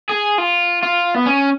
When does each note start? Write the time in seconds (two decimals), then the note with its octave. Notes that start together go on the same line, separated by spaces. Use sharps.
0.09 G#4
0.38 F4
0.83 F4
1.14 B3
1.26 C#4